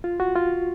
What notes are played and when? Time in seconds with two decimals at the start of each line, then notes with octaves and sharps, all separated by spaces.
0.04 F4
0.20 F#4
0.36 F4